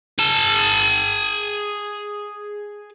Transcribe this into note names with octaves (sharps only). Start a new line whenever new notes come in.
G#4 A5